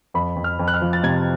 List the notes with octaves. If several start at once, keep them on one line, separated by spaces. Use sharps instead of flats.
F2 B5
F2
F6
F2
F#6
F6
F3
A6
C3 G#6